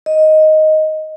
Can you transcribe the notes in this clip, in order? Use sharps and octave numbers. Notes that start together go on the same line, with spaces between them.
D#5